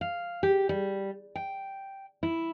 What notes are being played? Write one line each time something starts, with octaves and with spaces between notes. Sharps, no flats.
F5
G4
G3
G5
E4